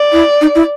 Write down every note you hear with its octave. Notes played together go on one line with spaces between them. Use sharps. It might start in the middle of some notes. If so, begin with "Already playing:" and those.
Already playing: D5
E4
D#4
E4